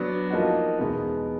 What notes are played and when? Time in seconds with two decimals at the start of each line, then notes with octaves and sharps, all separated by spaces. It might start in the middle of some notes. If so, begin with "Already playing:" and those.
Already playing: F#3 B3 D4
0.30 F3 A#3 D#4 F#4
0.79 E2 B2 G#3 B3 D#4